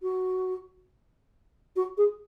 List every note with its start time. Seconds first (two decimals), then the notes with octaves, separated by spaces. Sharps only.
0.02 F#4
1.76 F#4
1.97 G#4